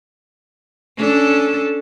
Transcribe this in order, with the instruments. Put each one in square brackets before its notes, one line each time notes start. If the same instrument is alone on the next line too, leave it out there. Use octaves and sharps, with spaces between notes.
[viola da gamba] C#4 D4 A4